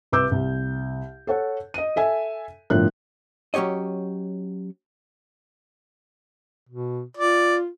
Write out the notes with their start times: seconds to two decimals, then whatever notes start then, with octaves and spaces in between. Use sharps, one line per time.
0.12 C2 B4 D6 E6 G6
0.31 C2
1.27 A4 C#5 F#5
1.74 D#5 D#7
1.96 A4 E5 G#5
2.70 G1 A2 F3 D4 A#4 F#6
3.54 F#3 C#4 G4 C#5 D#5
6.69 B2
7.17 F4 D5